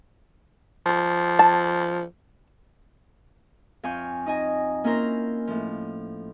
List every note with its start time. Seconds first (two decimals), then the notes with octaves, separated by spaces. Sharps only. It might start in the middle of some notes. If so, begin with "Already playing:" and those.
0.86 F3
1.39 A5
3.83 F2 F5 G#5 C#6 G6
4.26 D#4 D#5 G#5
4.84 A#3 C#4 E4 F4 A#4 C5
5.47 A2 F3